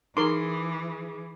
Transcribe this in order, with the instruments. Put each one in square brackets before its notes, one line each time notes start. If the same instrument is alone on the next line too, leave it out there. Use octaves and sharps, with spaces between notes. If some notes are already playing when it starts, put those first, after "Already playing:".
[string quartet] E3 [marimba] D#4 [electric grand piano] G#4 D6 [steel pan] A#4 C6